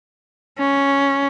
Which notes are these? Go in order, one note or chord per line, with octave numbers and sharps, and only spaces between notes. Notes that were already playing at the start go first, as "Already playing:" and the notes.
C#4